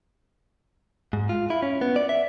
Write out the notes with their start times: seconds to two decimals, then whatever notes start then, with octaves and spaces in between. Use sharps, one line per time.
1.13 G#2
1.29 F4
1.50 E4
1.62 C#4
1.81 B3
1.96 D5
2.09 E5